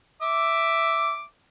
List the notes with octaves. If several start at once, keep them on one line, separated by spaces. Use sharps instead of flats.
E5 D6